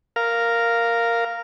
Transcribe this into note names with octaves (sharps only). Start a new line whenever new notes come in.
A#4 F5